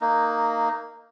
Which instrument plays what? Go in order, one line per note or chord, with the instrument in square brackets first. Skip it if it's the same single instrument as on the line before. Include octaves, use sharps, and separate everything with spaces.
[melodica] A#3 D#4